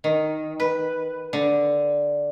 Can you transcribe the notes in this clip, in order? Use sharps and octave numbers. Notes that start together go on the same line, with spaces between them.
D#3
B4
D3